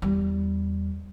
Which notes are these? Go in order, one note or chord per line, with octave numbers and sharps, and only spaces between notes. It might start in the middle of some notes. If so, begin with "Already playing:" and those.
E2 G3